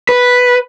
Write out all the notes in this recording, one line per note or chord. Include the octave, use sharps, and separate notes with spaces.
B4